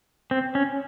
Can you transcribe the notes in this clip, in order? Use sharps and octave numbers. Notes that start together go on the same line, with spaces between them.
C4
C#4